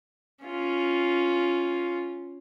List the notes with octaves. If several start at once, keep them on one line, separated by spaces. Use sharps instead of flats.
C#4 F4